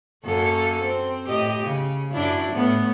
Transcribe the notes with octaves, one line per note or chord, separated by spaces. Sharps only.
F#2 A#3 A4
C4
A2 G4 D#5
C#3
F#2 D4 E4
A2 B3